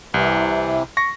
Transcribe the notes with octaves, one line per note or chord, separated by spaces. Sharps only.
C2 C3 E3
C#6 A#6